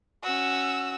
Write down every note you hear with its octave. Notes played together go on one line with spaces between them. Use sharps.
C#4 F#4 E6